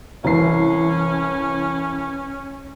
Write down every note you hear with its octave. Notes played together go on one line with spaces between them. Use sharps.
C2 E3 C#4 C7